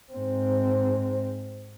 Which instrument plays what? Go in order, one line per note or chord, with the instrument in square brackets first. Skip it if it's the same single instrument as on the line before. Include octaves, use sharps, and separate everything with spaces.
[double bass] G#2 C4